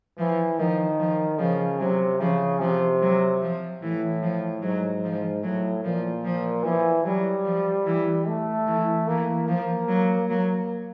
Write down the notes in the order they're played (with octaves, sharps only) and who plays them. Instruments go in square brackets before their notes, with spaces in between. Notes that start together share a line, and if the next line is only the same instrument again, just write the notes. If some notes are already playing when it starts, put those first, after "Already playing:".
[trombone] E3 [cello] F3
[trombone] D#3 [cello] F3
[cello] F3
[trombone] C#3 [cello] F3
[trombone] C3 [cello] F#3
[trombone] C#3 [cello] F3
[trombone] C3 [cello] F3
[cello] F#3
F3
[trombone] A2 [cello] E3
[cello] F3
[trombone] G#2 [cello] F#3
[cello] F3
[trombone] A2 [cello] F#3
[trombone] A#2 [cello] F3
[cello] F3
[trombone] E3 [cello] F3
[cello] F#3 [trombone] G3
[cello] F3
E3
[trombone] A3
[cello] E3
[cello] E3 [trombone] A#3
[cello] F3 [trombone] A#3
[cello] F#3
[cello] F#3 [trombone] A#3